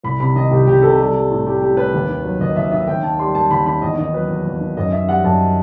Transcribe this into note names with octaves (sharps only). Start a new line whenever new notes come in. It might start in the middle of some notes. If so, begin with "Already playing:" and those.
C2 B5
C3 B5
D#3 D#5
C2 G4
C2 G4
C3 A4
G3
G3
A2
A2 G4
G3 G4
G3 B4
D#2
D#3
F#3
D#2 D#5
D#2 E5
D#3 E5
D#2 G5
D#3 A5
G3 C6
D#2 A5
D#2 B5
D#3 B5
E2 D#5
D#3 D#5
F#3 B4
E2
E2
D#3
F#2 D#5
D#3 E5
G3 F#5
F#2 A5